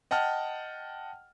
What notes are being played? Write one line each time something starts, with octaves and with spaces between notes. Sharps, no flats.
D#5 F#5 G5 A5 F6